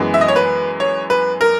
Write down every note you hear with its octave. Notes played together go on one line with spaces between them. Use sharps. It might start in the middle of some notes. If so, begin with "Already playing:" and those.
Already playing: F#2 E3 G#3 B3
E5
D#5
C#5
B4
C#5
B4
A#4